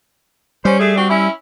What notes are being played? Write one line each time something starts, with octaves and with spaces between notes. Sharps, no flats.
G3 C#4 C5 C#5
A3 G#4
C4 D4 F#4
C#4 E4